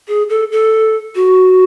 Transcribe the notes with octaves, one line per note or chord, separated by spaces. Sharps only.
G#4
A4
A4
F#4